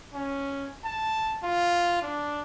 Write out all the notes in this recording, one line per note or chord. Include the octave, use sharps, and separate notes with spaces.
C#4
A5
F4
D4